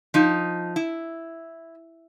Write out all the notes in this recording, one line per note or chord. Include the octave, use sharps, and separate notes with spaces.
F3 D#4
E4